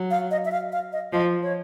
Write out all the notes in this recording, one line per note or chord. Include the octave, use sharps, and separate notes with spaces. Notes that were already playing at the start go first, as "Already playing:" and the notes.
Already playing: F#3
F5
D#5
E5
F5
F5
D#5
F3 D#5
C#5